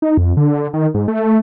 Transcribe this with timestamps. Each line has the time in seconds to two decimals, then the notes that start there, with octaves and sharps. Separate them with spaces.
0.02 D#4
0.17 F2
0.37 D3
0.74 D#3
0.94 G#2
1.08 A3